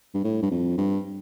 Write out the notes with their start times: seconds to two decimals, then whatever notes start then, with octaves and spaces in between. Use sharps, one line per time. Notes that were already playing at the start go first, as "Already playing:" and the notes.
0.14 G2
0.24 A2
0.42 G2
0.51 F2
0.78 G2